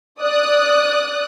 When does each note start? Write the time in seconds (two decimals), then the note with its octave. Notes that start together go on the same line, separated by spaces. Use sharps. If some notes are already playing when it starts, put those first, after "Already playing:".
0.20 D5 D#6 F#6